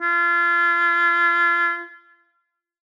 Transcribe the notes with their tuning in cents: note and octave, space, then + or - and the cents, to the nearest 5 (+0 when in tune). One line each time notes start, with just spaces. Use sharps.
F4 -30